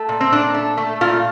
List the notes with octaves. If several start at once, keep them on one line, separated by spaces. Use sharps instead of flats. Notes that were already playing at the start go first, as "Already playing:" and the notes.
Already playing: A3
A#2
C4
A#2 D4
A3
A3
A#2 F4